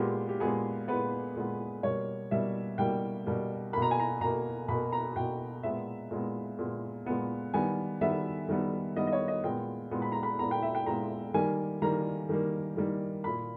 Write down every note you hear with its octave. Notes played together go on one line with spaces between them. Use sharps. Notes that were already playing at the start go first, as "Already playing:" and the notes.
Already playing: A#2 G#3 B3 G4
G4
A#2 G#3 B3 G#4
A#2 G#3 B3 B4
A#2 G#3 B3
B2 G3 A#3 C#5
B2 G3 A#3 E5
B2 G3 A#3 G5
B2 G3 A#3
B2 A#3 A#5 B5
G#5
A#5
B2 A#3 A#5
B2 A#3 B5
A#5
B2 A#3 G5
A#2 G#3 B3 E5
A#2 G#3 B3
A#2 G#3 B3
A#2 G#3 B3
D#3 G3 B3 G#5
D#3 G3 B3 E5
D#3 G3 B3
D#3 G3 B3 D#5
D#5
C#5
D#5
A#2 G#3 B3 G5
A#2 G#3 B3
B5
A#5
B5
A#2 G#3 B3 A#5
G5
E5
G5
A#2 G#3 B3 A#5
D#3 G3 A#3 G#5
D#3 G3 A#3 A#5
D#3 G3 A#3
D#3 G3 A#3
A#2 A#3 B5